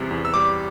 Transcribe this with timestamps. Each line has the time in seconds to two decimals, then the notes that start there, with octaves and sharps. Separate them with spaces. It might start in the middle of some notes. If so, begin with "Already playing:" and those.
Already playing: E2 C3 G3
0.11 E2
0.25 E6
0.34 G3 D6